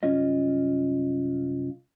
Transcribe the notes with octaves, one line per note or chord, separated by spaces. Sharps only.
C2 F#2 C#4 F4 D#5